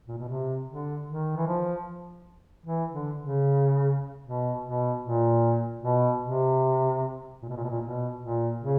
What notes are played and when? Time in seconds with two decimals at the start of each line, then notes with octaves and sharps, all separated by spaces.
0.08 A#2
0.18 B2
0.29 C3
0.68 D3
1.07 D#3
1.37 E3
1.47 F3
2.66 E3
2.92 D3
3.19 C#3
4.24 B2
4.64 B2
5.04 A#2
5.83 B2
6.23 C3
7.42 A#2
7.49 B2
7.56 A#2
7.64 B2
7.70 A#2
7.81 B2
8.21 A#2
8.60 C#3